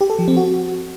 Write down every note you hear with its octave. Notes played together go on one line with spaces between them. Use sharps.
G4
A4
F3
C4
F#4